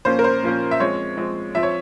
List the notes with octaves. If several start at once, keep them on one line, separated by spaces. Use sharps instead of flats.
A#2 F3 A#3 C#4 C5
A#4
C5
A#2 F3 A#3 C#4
E5
F3 G#3 C4 C#5
F3 G#3 C4
F3 C4 E5
C#5